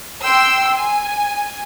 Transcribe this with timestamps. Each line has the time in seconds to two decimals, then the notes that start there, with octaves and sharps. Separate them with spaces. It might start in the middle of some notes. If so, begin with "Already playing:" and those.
0.23 G5 C6 E6
0.76 G#5